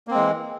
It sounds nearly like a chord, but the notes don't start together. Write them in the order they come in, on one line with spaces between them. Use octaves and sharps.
A#3 C4 G#3 E3